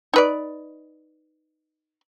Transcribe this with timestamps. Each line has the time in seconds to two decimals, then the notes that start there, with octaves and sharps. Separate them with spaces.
0.14 D#4 B4 D5